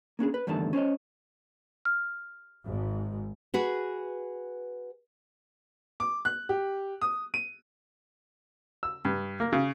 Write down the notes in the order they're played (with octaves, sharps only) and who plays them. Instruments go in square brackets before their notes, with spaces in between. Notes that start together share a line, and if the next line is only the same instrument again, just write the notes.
[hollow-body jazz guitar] A#3 C#4 D4 G#4
B4
E2 G2 D3 D#3 A3 A5
C#4 C5 C#5 D#5
[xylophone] F6
[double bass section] G#1 G#2
[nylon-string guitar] F#4 G#4 B4
[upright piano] D6
F#6
G4
D#6
D#7
[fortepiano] E6
G2
A#3
C#3